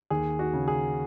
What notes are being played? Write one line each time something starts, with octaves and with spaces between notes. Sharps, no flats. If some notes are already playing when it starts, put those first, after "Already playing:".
D#2 G#4
F#4
C#3
G#4